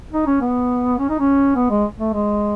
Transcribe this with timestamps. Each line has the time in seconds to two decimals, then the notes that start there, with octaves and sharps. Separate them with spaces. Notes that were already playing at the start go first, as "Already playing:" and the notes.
0.13 D#4
0.27 C#4
0.41 B3
0.99 C#4
1.09 D#4
1.19 C#4
1.56 B3
1.70 G#3
1.99 A3
2.13 G#3